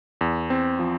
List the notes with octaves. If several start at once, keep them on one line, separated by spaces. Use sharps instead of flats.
E2
C4
F3